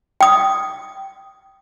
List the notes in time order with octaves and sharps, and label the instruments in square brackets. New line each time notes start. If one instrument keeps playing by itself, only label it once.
[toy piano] G5 D#6